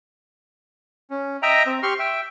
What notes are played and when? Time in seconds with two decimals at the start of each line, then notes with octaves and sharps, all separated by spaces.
1.10 C#4
1.42 D#5 E5 G5 A#5
1.66 C4
1.83 G4 C6 C#6 F6
1.99 E5 G5